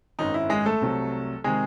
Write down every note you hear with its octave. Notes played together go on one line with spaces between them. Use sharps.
G#1 F#2 D#3 D#4
E4
G#3 G#4
A3 A4
C2 C3 F#3 A3
C3 D#3 G#3 G#4